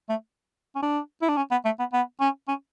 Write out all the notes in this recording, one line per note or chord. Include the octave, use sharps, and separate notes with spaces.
A3
C#4
D4
E4
D4
C#4
B3
A3
B3
B3
C#4
C#4